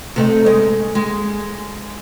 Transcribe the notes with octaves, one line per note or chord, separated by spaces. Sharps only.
C3 A3 D#4
G#3 D#5
G#3